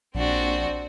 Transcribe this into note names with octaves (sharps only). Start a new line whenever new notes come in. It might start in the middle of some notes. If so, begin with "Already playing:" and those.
A#1 C4 D4 F#4